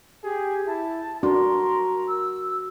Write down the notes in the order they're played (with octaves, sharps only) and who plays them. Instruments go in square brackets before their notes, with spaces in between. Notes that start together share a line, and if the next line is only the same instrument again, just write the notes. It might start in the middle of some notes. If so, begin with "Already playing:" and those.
[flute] G4 [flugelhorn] G#4
[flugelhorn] E4 [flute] A5
[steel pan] D4 [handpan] F#4 [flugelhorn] A#4 [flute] C6
[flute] E6